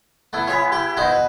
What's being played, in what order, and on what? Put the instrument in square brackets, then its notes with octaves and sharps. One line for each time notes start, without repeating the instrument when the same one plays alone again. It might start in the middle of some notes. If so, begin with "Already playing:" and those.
[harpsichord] A3 [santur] B3 E4
[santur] E4 G#4 B5 [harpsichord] C#5 E5
[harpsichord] G4
[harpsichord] B2 D#4 C5 [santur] B4 D#5
[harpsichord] B2